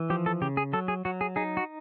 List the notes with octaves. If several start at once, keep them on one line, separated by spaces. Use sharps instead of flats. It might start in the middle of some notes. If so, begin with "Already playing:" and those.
Already playing: E3
F3 G4
A4
C#3 G4
G#4
F#3 A4
G#4
F#3 F#4
G#4
D#4 G#4
F#4